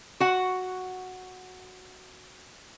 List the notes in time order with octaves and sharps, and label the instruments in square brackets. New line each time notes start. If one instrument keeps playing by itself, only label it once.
[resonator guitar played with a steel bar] F#4 F#5